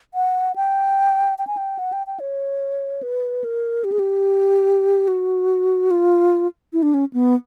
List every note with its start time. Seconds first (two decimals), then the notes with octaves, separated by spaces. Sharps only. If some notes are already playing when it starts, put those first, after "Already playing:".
0.14 F#5
0.56 G5
1.38 G5
1.47 G#5
1.57 G5
1.79 F#5
1.93 G5
2.07 G5
2.20 C#5
3.03 B4
3.44 A#4
3.84 G4
3.92 G#4
3.99 G4
5.08 F#4
5.91 F4
6.73 E4
6.82 D4
6.94 C#4
7.13 B3